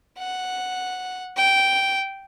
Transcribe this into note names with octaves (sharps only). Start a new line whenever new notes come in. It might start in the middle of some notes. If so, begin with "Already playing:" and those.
F#5
G5